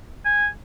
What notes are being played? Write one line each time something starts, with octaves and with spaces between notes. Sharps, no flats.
G#5